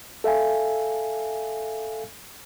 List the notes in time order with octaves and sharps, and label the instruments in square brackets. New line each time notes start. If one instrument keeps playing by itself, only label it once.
[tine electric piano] A4 E5 F5 G#5